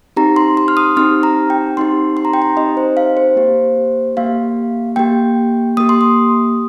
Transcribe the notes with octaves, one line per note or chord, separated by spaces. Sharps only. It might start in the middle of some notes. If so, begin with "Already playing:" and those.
C4 D#4 G4 A#5
C6
C6
F6
D#6
C4 D#4 G4 F6
A#5
G5
C4 D#4 G4 C6
C6
A#5
G5
A#5
C4 D#4 G4 D#5
C5
F5
C5
A#3 G4
A#3 G4 F5
A#3 G4 G5
A#3 G4 D#6
C6
D#6